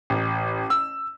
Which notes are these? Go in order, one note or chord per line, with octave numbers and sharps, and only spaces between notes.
A1
E6